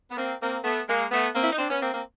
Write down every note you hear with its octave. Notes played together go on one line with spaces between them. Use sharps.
B3
A#3 C4
A#3 C4
A3 B3
G#3 A#3
A3 B3
A#3 C4
E4
D#4
C4 D4
B3 C#4
A#3 C4
A#3 C4